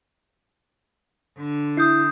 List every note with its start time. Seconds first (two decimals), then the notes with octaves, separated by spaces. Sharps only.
1.37 D3
1.77 E4 D#6 G6 C7